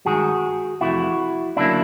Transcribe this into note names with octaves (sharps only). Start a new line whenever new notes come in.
G2 D#3 G#3 F#4 G#4
F2 C3 E3 A3 E4 F#4
D2 C#3 F#3 A#3 D4 E4